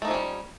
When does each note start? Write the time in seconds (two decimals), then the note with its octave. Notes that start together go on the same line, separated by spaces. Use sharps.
0.02 A3
0.05 D#4
0.08 F3
0.11 C#4
0.14 G3